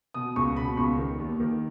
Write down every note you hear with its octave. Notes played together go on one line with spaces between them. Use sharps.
B2 D#6
C#2 C#6
B2 B5
C#2 C#6
D#3
D#2
D#3